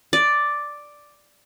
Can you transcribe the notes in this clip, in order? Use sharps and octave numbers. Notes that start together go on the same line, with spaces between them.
D5